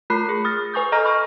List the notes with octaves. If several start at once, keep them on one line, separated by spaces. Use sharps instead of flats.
A3 F4 A#4 B5 F#6 C7
G#4
D#6 F6 A6 A#6
B4 G#5 C#6 D#6 G6
A4 D#5 A#5 F6 A#6
B5 C#6 F6